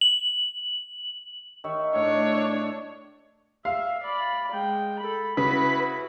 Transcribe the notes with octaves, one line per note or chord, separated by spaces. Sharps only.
F#7
D#3 C#5 E5
A2 D4 C#5
E5 F5
D5 B5
G#3 G5
A4 B5
C#3 E4 F#4 B4